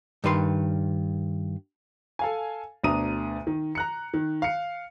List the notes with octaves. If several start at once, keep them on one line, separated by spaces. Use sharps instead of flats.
G2 D#3 B4 C6
A4 F5 G#5
D2 B2 D4 A#5 D#6 D#7
D#3
A#5 F#6 C#7
D#3
F5 C#7